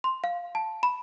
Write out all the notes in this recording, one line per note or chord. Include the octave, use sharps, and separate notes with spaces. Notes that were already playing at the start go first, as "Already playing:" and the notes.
C6
F5
A5
B5